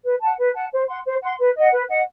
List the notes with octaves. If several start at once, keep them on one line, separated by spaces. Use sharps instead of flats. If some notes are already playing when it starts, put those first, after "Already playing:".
B4
F#5 A5
B4
F#5 A5
C5
F#5 C6
C5
F#5 C6
B4
D#5 F#5
B4
D#5 F#5